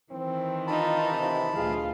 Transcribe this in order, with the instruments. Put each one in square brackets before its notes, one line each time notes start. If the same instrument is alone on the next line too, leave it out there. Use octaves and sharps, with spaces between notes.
[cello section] D#3 E3 [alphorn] C4
[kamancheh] D#4 F4 [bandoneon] A5 B5
[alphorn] C3
[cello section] D2 A#2 F4 [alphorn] G#4 [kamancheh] F5